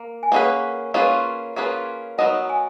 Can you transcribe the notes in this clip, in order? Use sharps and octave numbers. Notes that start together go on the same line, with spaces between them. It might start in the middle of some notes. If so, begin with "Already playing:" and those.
Already playing: A#3
G#5
A#3 C#4 F4 G#4 B4 F#5
A#3 C#4 F4 G#4 B4 F5
A#3 C#4 F4 G#4 B4
F#3 B3 D#4 A#4 D#5 F#5
G#5